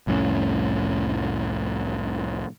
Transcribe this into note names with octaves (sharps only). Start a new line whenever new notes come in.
C2 F2 A2 C#4